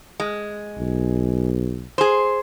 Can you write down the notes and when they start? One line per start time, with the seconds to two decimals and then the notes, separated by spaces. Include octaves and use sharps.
0.20 G#3
0.79 B1
1.98 G#4 C5